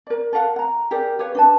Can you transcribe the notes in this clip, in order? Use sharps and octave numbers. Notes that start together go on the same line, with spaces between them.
A#4 D5
A4 A#4 F5 F#5
F#5 A#5
G4 G#4 A#4 D5
G4 B4 C#5 F5
D4 B4 A5